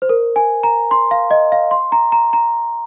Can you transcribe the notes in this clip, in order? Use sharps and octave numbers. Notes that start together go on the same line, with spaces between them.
C5
A#4
G#5
A#5
C6
F5
D#5
F5
C6
A#5
A#5
A#5